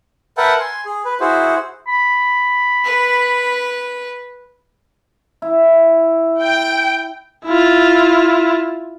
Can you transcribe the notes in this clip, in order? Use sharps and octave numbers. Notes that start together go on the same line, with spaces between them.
A#4 B4 E5 F#5 G5 A5
G#5 C6
G#4
B4
E4 F#4 G#4 C5
B5
B4
E4
G5
E4 F4